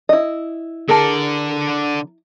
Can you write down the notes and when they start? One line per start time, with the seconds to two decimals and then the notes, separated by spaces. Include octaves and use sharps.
0.09 E4 D#5
0.88 D3 G#4 A#4 D5 A5